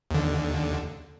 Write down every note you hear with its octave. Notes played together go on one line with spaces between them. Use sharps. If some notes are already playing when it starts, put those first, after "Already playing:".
D#2 D3